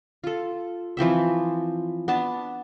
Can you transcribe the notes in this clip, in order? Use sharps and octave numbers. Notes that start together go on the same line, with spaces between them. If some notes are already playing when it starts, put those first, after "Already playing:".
F4 A4
E3 F3 C4 E5
B3 D4 A5